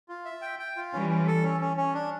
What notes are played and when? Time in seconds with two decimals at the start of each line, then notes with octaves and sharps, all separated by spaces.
0.09 F4
0.25 E5
0.42 G5
0.59 G5
0.76 F4
0.93 E3 G3 C#4
1.10 C#4
1.27 A4
1.43 C#4
1.61 C#4
1.77 C#4
1.94 D4